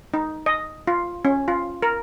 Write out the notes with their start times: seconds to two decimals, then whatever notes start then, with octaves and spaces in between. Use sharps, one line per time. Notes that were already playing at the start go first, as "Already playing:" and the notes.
0.14 D#4
0.46 D#5
0.87 F4
1.25 C#4
1.48 F4
1.82 A#4